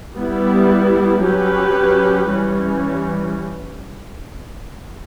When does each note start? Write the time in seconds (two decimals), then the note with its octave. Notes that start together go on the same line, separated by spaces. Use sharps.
0.16 G3 B3 E4
1.23 F#3 C#4 G4 B4
2.31 E3 G3 C#4